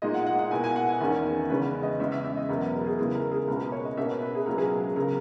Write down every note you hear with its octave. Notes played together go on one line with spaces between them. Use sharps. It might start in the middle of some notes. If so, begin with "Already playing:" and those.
A#2 G#3 D#4 D#5
F#5
F#5
F#5
B2 A#3 E4 G#5
G#5
F#5
G#5
E2 D#3 A#3 C#4
E2 C#3 G#3 C#4 B4
D#5
E2 C#3 G#3 C#4 E5
E5
E5
D#5
E2 B2 F#3 A#4
B4
A#4
G#4
C#3 G#3 B3 E4 G#4
A#4
G#4
C#2 B2 A#3 C#4 A#4
B4
C#5
D#5
B2 A#3 C#4 E5
B4
B4
G#4
C#2 B2 F#3 A#3 C#4 A#4
G#4
C#3 F#3 B3 A#4